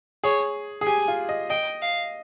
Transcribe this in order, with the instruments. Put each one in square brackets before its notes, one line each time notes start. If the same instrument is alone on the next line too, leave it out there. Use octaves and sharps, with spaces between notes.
[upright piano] G#4 [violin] C#5
[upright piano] G#4
[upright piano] G4 [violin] G#5
[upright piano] F4
D#5
[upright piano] D#5 [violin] G5
[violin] F5